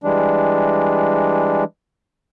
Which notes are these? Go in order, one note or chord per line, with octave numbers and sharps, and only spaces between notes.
E3 G3 G#3 D4